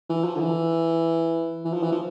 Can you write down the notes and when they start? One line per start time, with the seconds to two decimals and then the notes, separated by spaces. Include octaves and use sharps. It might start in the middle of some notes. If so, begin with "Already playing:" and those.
0.09 E3
0.24 F3
0.36 D3
0.40 E3
1.65 E3
1.73 F3
1.82 E3
1.92 F3